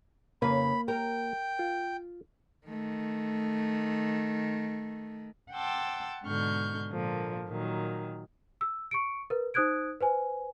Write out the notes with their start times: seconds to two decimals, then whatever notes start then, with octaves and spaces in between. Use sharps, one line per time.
0.42 F2 C#3 A#3 B4 B5
0.88 A#4 G5
1.59 F4
2.67 D#3 A3
5.53 F#5 G5 A5 C6 D6 E6
6.24 G#2 B2 D3 C#6 F6 G6
6.91 A#2 D3 F3 A#3
7.47 A#2 D#3 F#3
8.61 E6
8.91 C#6 C#7 D7
9.30 A#4 B4
9.54 D#4 C5 D#6 F#6 G#6 D7
10.01 B4 C5 G#5